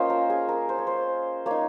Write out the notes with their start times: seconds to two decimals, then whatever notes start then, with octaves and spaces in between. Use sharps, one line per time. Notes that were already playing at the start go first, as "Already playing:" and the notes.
Already playing: A#3 C#4 F4 C5 D#5 F5
0.10 A#4
0.30 G#4
0.48 A#4
0.69 C5
0.78 C#5
0.87 C5
1.46 A#3 D#4 C#5